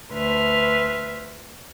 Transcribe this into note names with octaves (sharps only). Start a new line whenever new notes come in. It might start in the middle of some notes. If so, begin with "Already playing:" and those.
D2 B4 E5 C6 F6